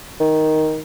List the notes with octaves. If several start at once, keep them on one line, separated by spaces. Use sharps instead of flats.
D#3